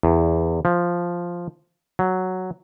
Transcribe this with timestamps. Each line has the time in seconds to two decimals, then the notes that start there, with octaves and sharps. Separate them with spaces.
0.03 E2
0.65 F3
1.99 F#3